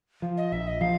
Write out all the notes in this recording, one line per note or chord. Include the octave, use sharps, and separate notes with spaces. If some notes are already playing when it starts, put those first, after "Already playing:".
F3
D#5
A#1 E5
D#5
F3 F5